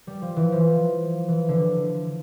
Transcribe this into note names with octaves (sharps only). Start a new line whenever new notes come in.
G3
F3
E3
F3
E3
D3